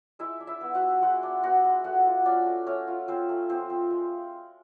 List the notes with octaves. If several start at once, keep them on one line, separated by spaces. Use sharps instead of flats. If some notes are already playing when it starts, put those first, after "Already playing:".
G#3 E4 E5
D4
E4 E5
B3
F#4 F#5
G#3
G#3 F#4 F#5
D4
B3 F#4 F#5
G#3
A3 F#4 F#5
F4
C#4 D4 D5
A3
A3 C#4 C#5
F4
C4 C#4 C5
A3
F3 C4 C5
C4
G#3